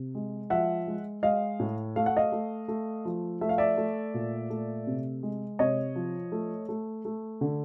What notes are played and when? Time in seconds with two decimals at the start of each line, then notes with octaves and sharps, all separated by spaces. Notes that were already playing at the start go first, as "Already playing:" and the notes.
Already playing: C3
0.15 G#3
0.50 F3 E5 F#5
0.87 G#3
1.23 G#3 D#5 F5
1.60 A2
1.96 A3 F5
2.06 F#5
2.17 D#5 F5
2.32 A3
2.68 A3
3.05 F3
3.41 A3 E5
3.49 F5
3.58 D5 E5
3.77 A3
4.14 A#2
4.50 A3
4.87 C3
5.23 G#3
5.59 C3 C#5 D#5
5.96 F3
6.32 A3
6.69 A3
7.05 A3
7.41 D3